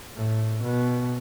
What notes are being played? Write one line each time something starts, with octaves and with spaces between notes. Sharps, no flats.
A2
B2